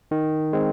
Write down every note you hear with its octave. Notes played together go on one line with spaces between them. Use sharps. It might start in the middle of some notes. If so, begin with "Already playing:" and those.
D#3
G#3 C4